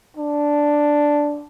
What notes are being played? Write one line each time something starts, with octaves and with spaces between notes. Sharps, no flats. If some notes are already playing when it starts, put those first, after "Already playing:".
D4